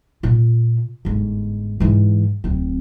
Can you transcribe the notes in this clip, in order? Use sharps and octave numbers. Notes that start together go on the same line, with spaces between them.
A#2 F4
G1 G#2
G#2 E3
D1 C4